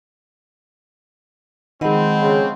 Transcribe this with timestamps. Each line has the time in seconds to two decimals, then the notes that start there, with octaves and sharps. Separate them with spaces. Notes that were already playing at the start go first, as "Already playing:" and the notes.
1.81 D#3 F3 G#3 C4 D#5 F#5 B5
2.22 C#3